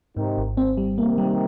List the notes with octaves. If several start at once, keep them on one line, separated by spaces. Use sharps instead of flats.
G#2 C3 D#3
G#1
C4
G3
C3 D#3 A#3
G3